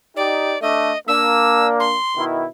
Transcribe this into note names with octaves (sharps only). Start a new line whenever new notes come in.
D#4 G4 D5
A3 D4 D#5
A#3 D4 E6
C6
B2 D#3 E4